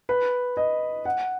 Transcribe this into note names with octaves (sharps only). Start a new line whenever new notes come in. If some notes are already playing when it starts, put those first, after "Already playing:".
B4
D#5
F#5